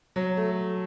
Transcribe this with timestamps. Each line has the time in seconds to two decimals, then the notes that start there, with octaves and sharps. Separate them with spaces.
0.16 F#3
0.37 A3